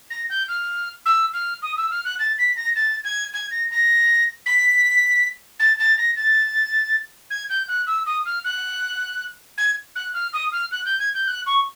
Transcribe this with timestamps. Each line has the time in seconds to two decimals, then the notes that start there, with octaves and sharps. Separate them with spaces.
0.10 A#6
0.29 G6
0.48 F6
1.05 E6
1.33 F6
1.62 D#6
1.77 E6
1.90 F6
2.04 F#6
2.19 A6
2.38 B6
2.56 A#6
2.76 A6
3.04 G#6
3.33 G#6
3.51 A#6
3.71 A#6
4.46 B6
5.59 A6
5.79 A6
5.98 A#6
6.16 A6
7.30 G#6
7.49 G6
7.68 F#6
7.86 E6
8.06 D#6
8.25 F6
8.44 F#6
9.57 G#6
9.95 F#6
10.14 F6
10.33 D#6
10.52 F6
10.71 F#6
10.85 G6
10.99 G#6
11.14 G6
11.27 F#6
11.46 C#6